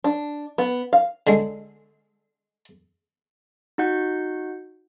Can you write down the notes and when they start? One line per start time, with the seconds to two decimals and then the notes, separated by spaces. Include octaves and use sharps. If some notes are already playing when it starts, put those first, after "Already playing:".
0.04 D4
0.58 B3
0.93 F5
1.27 D3 G#3
3.78 D#4 F#4 F#5 G6